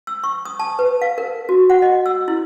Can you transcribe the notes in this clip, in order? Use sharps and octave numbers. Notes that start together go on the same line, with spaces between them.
E6
C#6
D#6
A5
B4
F5
A#4
F#4
F#5
D#5
E6
E4